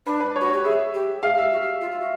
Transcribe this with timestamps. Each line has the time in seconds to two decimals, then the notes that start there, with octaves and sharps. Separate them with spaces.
0.06 D4 B4
0.20 B4
0.36 F#4 C#5
0.50 G4 C#5
0.64 G#4 E5
0.94 G4
1.22 G#4 F5
1.37 G4 E5
1.51 F#4
1.62 G4
1.81 F4
1.91 F4
2.00 F#4